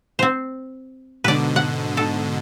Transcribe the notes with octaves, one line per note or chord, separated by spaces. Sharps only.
C4 C5
G#2 B2 D3 B4 D5
F#5
A4